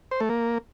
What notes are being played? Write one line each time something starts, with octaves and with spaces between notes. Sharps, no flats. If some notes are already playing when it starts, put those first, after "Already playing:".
C5
A3
A#3